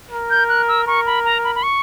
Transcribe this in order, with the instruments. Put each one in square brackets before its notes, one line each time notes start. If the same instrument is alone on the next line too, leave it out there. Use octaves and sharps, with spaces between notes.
[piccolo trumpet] A#4
[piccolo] G6
F#6
E6
[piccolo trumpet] A#4 [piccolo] C#6
[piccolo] B5
A#5
B5
B5
C#6